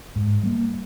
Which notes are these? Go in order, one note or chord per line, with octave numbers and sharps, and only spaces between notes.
G#2
G3 A#3